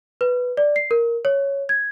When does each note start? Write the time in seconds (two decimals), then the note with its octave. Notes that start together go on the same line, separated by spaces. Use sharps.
0.21 B4
0.57 D5
0.76 C7
0.91 A#4
1.25 C#5
1.69 G#6